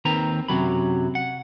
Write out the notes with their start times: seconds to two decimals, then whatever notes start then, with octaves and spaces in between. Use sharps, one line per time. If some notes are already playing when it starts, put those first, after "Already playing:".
0.05 D#2 D#3 C4 B4 A#5
0.48 F#2 C3 F#3 B5
1.15 F#5